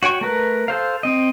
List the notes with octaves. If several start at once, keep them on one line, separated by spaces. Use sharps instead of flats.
F#4 C#5 G5 C#6
A3 A#4 B4
A4 C5 F5
C4 D#5